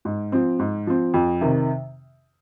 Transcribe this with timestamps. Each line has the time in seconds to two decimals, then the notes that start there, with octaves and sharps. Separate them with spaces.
0.05 G#2
0.32 F3 C4
0.59 G#2
0.87 F3 C4
1.14 F2
1.41 C3 D#3